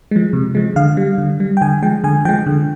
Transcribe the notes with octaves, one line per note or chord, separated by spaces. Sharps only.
F3 G#3
C3
F3 G#3
D3 F5
G3
D3
G3
G5
D3 G#5
F3 G#3 G5
D3 G#5
F3 G#3 G5
D3